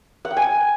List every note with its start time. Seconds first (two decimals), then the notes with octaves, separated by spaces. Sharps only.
0.25 F#5
0.31 G5
0.37 G#5